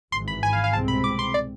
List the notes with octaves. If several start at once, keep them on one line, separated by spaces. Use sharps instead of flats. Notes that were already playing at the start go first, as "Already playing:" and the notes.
G#1 G#2 E3 C6
B5
G#5
F5
F5
C2 B2 G#3 C4 A5
B5
D6
C6
D5